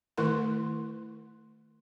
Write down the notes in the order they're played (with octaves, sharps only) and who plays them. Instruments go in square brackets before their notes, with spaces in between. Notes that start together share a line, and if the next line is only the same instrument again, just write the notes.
[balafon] D#3 A3 E4 A#4 C6 C#6